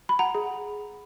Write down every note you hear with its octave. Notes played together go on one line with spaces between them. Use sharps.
B5
F#5 A#5
G#4